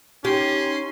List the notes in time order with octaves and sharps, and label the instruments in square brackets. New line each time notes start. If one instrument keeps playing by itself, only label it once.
[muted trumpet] C#4 [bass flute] D#4 [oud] G4 [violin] C6